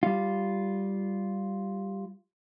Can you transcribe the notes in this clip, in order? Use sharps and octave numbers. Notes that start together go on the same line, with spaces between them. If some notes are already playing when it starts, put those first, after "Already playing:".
G3 F4